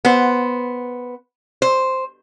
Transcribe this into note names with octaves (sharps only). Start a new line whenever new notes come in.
B3 C5
C5